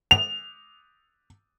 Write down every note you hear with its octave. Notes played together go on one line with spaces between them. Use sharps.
F7